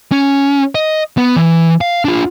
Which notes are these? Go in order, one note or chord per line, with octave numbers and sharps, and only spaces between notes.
C#4
D#5
B3
E3
F5
D4 F4